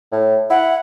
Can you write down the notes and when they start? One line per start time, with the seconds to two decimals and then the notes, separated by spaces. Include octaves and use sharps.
0.12 A2
0.50 E4 F#5